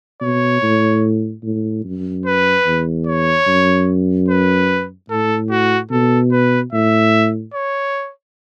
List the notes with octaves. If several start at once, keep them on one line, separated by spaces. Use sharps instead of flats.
B2 C#5
A2
A2
F#2
B4
E2
C#5
F#2
B4
A2 A4
F#4
B2 A4
B4
A2 E5
C#5